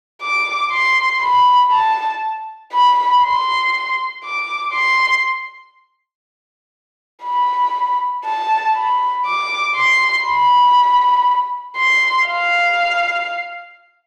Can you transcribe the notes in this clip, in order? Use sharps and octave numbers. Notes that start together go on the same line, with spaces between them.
D6
C6
B5
A5
B5
C6
D6
C6
B5
A5
B5
D6
C6
B5
C6
F5